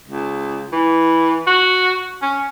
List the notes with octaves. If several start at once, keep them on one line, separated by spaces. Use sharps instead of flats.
C#2
E3
F#4
C#4